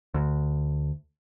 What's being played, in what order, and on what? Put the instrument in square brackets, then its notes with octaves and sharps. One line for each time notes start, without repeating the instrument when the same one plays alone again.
[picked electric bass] D2